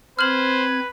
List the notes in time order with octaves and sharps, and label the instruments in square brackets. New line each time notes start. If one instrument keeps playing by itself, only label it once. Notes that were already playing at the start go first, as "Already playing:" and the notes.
[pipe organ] C4 G#6 [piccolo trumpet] B4 [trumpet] C5 [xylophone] F6 F#7